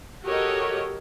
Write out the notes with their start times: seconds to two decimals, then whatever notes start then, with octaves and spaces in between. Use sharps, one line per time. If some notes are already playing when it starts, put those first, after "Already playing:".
0.23 F#4 G4 A4 A#4 C#5 D#5